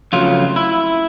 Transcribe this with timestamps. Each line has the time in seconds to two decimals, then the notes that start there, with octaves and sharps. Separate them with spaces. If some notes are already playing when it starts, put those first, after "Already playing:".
0.13 F2 C#3 F#3 A3 F4
0.56 E4